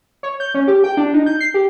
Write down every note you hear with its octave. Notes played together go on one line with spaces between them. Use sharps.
C#5
G6
C#4
G4
G5
D4
D#4
G6
C7
G4